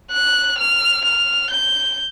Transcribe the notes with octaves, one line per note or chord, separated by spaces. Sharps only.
F#6
F6
F6
G6